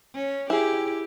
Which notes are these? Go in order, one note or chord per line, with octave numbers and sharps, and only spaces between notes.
C#4
E4 G4 G#4